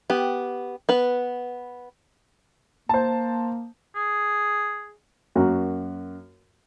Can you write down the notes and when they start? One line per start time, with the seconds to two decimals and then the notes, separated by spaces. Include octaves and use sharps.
0.10 B3 G4
0.89 B3 B4
2.89 A#3 C5 A5
3.95 G#4
5.35 F#2 A#3 F#4